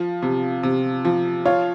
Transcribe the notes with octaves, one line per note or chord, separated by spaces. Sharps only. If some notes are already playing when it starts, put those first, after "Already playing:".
Already playing: F3
C3
C3
F3
F4 C#5